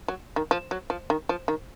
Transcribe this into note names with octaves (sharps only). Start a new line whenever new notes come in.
F#3
D#3
F3
F#3
F3
D#3
F3
D#3